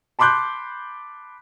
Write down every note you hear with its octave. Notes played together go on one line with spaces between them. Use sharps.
A5 B5 C6 D6 F#6 G6